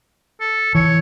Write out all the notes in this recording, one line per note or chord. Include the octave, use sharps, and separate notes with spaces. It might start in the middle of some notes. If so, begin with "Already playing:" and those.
A4
E3 C#5